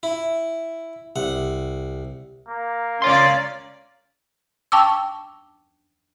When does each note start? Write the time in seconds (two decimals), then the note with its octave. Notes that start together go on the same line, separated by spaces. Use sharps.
0.03 E4
1.16 C2 F#5
2.49 A#3
3.02 C#2 C#4 D5 F5 C6
4.72 G5 A5 C#6 D6 E6